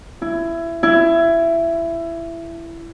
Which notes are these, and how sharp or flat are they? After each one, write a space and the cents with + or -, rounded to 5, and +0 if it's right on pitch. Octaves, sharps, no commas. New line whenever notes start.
E4 +20
E4 +20